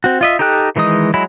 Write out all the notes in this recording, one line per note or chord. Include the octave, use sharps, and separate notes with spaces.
C4 F#4
F4 D#5 E5
D#4 G4 A4 G5 F#6
D#3 E3 G#3 D#4 D#6
F#3 G#3 E4 B5